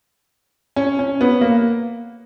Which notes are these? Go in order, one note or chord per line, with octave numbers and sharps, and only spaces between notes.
C#4
C#4
B3
A#3